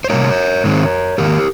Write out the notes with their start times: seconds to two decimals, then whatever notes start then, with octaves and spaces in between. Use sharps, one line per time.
0.04 C5
0.10 C3 G3 A#3 A#4 C#5
0.64 G#2 D#3 G#3 C4
1.18 G#2 D#3 A#3 G4 A#4